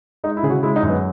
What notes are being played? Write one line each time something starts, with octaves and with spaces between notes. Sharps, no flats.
G#3 D#4
E4
C#3 G#4
F#4
G#3 E4
D#4
F#2
B3